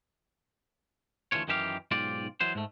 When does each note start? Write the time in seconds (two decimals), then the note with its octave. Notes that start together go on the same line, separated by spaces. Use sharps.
1.32 D2 E3 A3 F4 C#5
1.48 F#2 D#3 E3 G4 E5 F5
1.91 B1 G#2 F4 G4 D5
2.40 E3 F#3 C5
2.55 G#2 A3